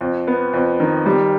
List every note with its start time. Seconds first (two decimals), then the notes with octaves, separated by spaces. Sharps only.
0.01 F2
0.27 B3
0.53 F2
0.80 D#3
1.06 G3